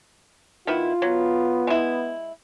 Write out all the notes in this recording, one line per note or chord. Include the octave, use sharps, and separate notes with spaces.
D#3 B3 E4 F4
F#3 B3
G#3 E4